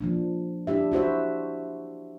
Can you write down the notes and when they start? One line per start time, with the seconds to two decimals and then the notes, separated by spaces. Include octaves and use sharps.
0.01 F3 A#3 D4
0.67 D4 E4 G4 E5
0.92 E4 F#4 C5 E5